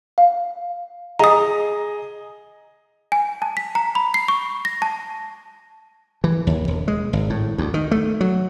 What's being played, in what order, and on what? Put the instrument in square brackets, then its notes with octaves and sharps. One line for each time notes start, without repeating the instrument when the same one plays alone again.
[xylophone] F5
[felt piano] G#4 D#5 [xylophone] A#5 D#6
[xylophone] G#5
A5
B6
A#5
B5
C7
C#6
A#6
A5
[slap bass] E3
D#2
E1
G#3
G#1
A2
D2
D#3
A3
F#3